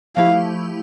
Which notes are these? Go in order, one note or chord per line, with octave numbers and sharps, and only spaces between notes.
F3 A3 E4 G4 F5